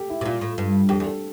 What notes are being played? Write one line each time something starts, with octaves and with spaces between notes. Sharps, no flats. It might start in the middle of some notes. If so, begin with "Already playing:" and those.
Already playing: G4 A4
E4
C3
A#2 F4
A2
G2
F2 G4
E2
A4